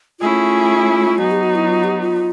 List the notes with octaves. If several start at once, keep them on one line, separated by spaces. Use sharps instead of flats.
A3 C#4 E4 F4 G#4
F#3 B3 D#4 F#4
G4
F#4
E4
F4
G4
F4